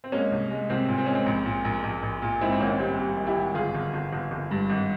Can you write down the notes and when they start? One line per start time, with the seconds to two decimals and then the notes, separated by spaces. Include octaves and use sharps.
0.04 C4
0.12 G#3 A#3 C#4
0.31 C2
0.51 G#3
0.70 C2 C4
0.88 A#2
0.98 C4
1.06 G#3 C#4
1.15 C4
1.26 A#1
1.46 A#2
1.65 A#1
1.83 A#1
2.03 A#1
2.22 A#2
2.41 G#2 C4 E4
2.52 C4
2.60 G#1 A#3 C#4
2.79 G3 C4
2.98 G3
3.17 G#1
3.26 E4 G4
3.36 G#1
3.55 G1 F4 G#4
3.75 G1
3.94 G1
4.13 G1
4.31 G1
4.51 G2
4.70 G#1